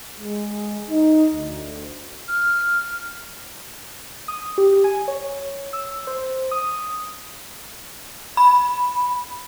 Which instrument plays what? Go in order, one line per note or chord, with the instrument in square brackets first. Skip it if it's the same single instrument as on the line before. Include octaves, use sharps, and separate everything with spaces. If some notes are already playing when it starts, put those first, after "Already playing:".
[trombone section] G#3
D#4
D2
[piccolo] F6
[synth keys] D#6
G4
G#5
C#5
E6
C5
D#6
[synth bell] B5